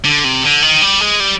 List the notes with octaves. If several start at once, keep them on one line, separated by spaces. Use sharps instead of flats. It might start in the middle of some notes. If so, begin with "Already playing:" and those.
D3
C3
D3
D#3
G3
G#3
G3